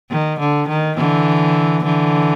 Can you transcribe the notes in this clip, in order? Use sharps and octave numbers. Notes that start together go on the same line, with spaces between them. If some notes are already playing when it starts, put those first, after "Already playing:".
D#3
D3
D#3
D3 E3
D3 E3